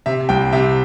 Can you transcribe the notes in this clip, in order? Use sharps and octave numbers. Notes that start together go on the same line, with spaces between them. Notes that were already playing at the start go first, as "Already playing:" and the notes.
C3 E5
C2 G5
C3 E5